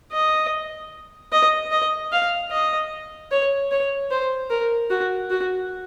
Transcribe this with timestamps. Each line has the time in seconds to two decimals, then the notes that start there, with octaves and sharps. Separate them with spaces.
0.12 D#5
1.32 D#5
1.71 D#5
2.12 F5
2.51 D#5
3.31 C#5
3.71 C#5
4.11 C5
4.50 A#4
4.90 F#4
5.30 F#4